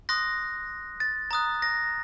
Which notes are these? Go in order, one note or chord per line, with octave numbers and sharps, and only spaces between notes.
C6 D#6 F#6 A#6
A6
A#5 D#6 F#6 A6
A#6